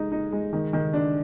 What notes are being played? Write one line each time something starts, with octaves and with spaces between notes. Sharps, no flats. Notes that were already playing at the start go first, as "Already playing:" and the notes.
Already playing: G#3 D#4
D#4
G#3
D#3
D#3
D4